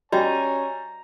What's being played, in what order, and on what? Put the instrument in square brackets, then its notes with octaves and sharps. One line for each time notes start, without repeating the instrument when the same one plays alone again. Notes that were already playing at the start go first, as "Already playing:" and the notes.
[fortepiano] G3 [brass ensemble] C#4 C#5 G#5 [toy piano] F#4 D#5 G5 [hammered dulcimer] A#5